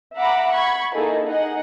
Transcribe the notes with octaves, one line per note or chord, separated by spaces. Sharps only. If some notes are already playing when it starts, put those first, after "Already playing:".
E5 F#5 A#5 B5 D6
B5 C#6 G#6
A#3 D#4 E4 G#4 A4
D#4 G#4 D#5 F#5